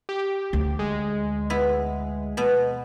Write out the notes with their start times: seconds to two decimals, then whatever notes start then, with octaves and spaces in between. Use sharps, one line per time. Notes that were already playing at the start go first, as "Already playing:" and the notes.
0.09 G4
0.53 D2
0.79 G#3
1.50 B3 E4
2.37 B2 B3